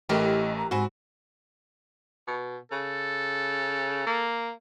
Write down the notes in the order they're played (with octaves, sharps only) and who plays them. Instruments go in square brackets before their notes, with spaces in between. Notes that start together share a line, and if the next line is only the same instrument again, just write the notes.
[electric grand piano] A1 A3 A#4 [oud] E3 G4 [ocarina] D#5
[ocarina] A#5
[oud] G#2 C4 B4 [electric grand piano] F#4 [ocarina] G#5
[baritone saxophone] B2
[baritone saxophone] C#3 [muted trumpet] A4
[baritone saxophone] A#3